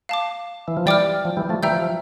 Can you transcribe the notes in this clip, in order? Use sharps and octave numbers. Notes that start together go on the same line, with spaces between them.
F5 A5 D6
E3
F3
E3 G3 D5 G5 D6 F6
F3
E3 G3
F3 A3
E3 G3 E5 G5 A#5 E6 G6
F3
F3